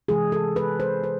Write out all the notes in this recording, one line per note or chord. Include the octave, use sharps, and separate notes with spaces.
C3 E3 G#3 G#4
A4
B4
C5
C5